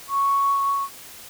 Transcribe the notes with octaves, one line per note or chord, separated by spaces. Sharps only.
C#6